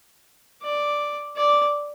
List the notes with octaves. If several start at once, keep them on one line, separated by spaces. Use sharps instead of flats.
D5
D5